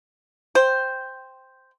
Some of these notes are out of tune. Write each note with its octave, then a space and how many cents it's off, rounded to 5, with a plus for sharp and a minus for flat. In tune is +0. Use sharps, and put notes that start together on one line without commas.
C5 +0 G5 +0